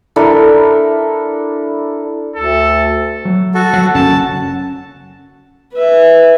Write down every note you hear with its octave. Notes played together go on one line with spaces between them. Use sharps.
D4 E4 A4 A#4
D2 A4
F#3
F#4 A4
F#3 F#5
F#1 F#2 C#4 A5
B4 E5